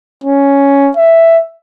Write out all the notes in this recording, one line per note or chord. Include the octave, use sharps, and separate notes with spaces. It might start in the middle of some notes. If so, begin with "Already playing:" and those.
C#4
E5